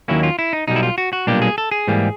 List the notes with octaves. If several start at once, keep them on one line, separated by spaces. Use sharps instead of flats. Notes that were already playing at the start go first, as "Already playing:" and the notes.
D#2 D#3 F#3 A#3 C#4 E4
F4
E4
D#4
B1 B2 G3 D#4
E4
F4
F#4
F#4
B1 A#2 G3 A#3 D4 G4
G#4
A4
G#4
G#2 E3 G3 A#3